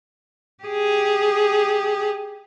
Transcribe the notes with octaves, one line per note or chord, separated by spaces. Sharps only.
G4 G#4